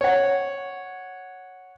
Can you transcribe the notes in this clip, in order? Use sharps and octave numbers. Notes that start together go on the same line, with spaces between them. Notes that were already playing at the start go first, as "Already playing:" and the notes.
C#5 F#5